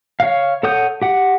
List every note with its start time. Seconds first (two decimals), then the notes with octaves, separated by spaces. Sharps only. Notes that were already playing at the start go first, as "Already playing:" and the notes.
0.20 C#5 F5
0.63 A4 C#5 F#5 D#6 G6
1.02 G4 F#5